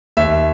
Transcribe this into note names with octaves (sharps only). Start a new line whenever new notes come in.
D#2 E5